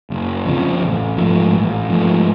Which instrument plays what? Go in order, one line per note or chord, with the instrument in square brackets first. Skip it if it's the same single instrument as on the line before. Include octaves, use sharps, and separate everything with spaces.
[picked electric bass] F#1
F2 C#3 F3
A1
G#2 F3 A3
A1
G#2 F3 A3